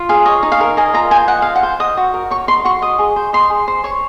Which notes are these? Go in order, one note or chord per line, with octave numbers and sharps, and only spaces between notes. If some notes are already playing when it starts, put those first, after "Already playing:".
Already playing: F4
G#4 F5
C#5 D#5
D#4
F5
A#4
D#5 G#5
F4 A#5
C5 G#5
D#5 F#5
F4 F5
F#5
C5
D#5 D#6
F#4
A#4
C#5 C#6
D#4 C6
F#4 C#6
D#5 D#6
G#4
C5
D#5 C6
G#4
C5
C#5 C#6